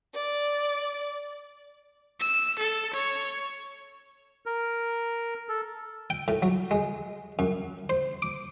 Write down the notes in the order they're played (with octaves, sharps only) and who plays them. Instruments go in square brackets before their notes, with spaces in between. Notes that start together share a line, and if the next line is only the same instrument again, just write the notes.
[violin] D5
[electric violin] E6
A4
C#5
[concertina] A#4
A4
[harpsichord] G5
A2
F#3
G#3
F#2
C5
D6